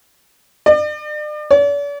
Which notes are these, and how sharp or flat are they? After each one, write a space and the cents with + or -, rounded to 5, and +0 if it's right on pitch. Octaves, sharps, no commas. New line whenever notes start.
D5 +40
D5 -45